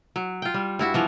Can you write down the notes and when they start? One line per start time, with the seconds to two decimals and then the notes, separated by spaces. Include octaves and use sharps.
0.16 F#3
0.42 F4 G5
0.54 G3
0.79 G2 E4 F#4 E5
0.94 E3 F3 B3